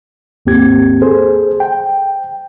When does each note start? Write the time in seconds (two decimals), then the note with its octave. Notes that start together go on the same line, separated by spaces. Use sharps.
0.46 D#2 G#2 A#3 C4 G4 G#6
1.02 G#4 A4 C5
1.60 G5